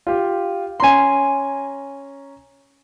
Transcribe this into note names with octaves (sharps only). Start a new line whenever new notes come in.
F4 G4
C#4 G#5 A#5 C6